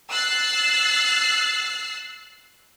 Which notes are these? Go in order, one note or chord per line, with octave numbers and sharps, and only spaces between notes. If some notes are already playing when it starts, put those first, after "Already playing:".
E6 F#6 A6 C7